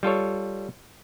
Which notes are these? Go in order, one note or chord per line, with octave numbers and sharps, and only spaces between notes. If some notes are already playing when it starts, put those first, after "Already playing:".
G3 F4 A4 C#5